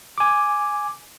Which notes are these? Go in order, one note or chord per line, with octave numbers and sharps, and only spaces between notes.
G#5 D6